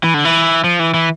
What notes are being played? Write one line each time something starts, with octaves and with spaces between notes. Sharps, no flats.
E3
D3
E3
F3
E3
E3